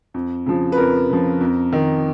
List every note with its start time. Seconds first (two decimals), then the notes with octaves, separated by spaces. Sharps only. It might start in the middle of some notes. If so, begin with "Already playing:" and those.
0.14 F2
0.46 C#3 F3
0.72 B4
0.77 F2 A#4
1.10 C#3 F3
1.41 F2
1.72 D#3